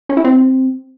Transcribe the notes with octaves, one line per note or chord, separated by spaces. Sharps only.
C#4
E4
C4